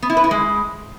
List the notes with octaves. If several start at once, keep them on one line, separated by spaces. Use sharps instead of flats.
B3
E4
B4
E4
G#3